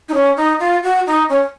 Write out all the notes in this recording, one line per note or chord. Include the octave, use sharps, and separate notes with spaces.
D#4
C#4
D#4
F4
F#4
D#4
C#4